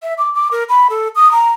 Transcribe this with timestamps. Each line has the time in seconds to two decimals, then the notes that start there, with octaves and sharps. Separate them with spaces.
0.03 E5
0.18 D6
0.34 D6
0.51 A#4
0.69 B5
0.90 A4
1.16 D#6
1.32 A#5